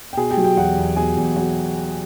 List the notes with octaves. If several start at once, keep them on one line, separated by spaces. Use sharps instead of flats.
G5
B2 G#4 G#5
G4 G5
F#3
G4 G5
E2 F#4 F#5
E2
B2 G#4 G#5
E2
F#3 F#4 F#5